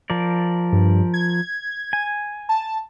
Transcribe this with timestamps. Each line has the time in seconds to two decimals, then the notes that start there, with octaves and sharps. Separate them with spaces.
0.10 F3 A#4 D5
0.72 G2
1.14 G#6
1.93 G#5
2.49 A5